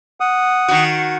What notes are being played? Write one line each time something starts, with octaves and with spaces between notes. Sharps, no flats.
F#5 D#6
D#3 F#4